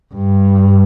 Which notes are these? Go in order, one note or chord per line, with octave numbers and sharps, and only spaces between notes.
G2